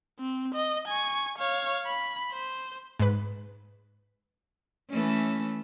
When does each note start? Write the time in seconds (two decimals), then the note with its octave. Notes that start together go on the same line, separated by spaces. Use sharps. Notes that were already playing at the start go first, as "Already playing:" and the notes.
0.19 C4
0.54 D#5
0.88 G#5 C#6
1.38 C#5 F5
1.86 B5
2.32 C5
3.00 G#2 B4
4.90 E3 A3 C#4